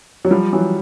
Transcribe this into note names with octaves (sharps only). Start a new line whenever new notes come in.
F#3
F3 G3
E3 F#3